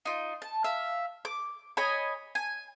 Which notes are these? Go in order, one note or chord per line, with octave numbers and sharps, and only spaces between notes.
D#4 F4
A5
E5 F5
D6
C#5 D#5 G#5 B5
G#5